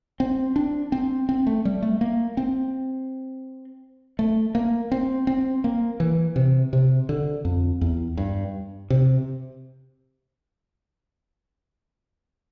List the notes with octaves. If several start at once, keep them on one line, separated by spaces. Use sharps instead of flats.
C4
D4
C4
C4
A3
G3
A3
A#3
C4
A3
A#3
C4
C4
A#3
E3
C3
C3
D3
F2
E2
G2
C3